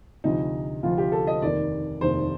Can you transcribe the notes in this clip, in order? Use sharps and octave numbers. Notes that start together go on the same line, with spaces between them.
D2 C3 F3 D#4
D2 C3 F3 F4
G4
A4
D#5
F1 D#2 D#3 D5
F1 D#2 D#3 C5